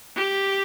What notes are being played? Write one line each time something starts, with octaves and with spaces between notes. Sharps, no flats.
G4